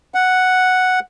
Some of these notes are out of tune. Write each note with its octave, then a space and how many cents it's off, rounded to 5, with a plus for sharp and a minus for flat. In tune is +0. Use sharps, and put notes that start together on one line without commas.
F#5 +0